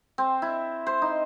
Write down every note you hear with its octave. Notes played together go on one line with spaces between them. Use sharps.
C4
E4
C5
D#4